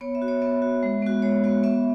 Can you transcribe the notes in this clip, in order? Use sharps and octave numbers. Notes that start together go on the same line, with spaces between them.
B3 C#5
E5
F#4
C#5
B3 E5
F#4
G#3
B3 F#4
G#3 C#5
B3 F#4
B3 E5